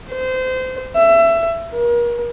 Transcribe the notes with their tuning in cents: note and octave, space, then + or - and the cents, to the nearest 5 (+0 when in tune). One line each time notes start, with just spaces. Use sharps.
C5 -25
E5 +20
A#4 +35